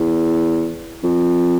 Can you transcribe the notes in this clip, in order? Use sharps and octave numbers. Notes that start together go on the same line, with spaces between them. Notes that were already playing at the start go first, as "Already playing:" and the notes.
Already playing: E2
F2